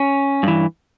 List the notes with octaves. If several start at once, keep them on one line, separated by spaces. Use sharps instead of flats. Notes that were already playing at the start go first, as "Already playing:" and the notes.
Already playing: C#4
G2 E3